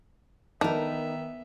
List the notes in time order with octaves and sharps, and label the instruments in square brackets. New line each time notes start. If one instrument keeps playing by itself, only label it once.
[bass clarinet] D#3 [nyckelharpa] B3 E5 [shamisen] D4 [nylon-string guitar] D#4 A#4